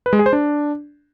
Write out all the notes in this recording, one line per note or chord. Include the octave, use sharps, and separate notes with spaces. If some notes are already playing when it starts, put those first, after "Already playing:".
B4
G#3
G#4
C5
D4